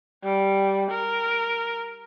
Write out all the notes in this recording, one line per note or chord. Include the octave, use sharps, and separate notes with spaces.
G3
A#4